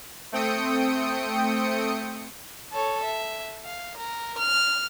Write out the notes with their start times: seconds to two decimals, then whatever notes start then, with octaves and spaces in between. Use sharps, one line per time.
0.32 A3 C4 G5 D#6 C#7
2.72 A4 C#5
3.03 E5
3.64 F5
3.97 A#4
4.38 F6